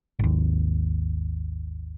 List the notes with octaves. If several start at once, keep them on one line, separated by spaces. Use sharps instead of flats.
G#1 D#2